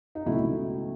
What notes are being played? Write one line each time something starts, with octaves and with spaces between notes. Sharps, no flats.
D#4
C#2 B2 F#3 A3 E4